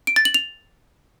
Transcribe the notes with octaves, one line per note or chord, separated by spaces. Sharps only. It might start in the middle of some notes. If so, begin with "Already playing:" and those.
D7
A6
F#7
F7